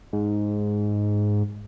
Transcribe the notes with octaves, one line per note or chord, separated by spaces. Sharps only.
G#2